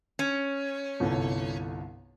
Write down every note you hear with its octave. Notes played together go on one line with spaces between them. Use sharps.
C#4
G1 C2 A4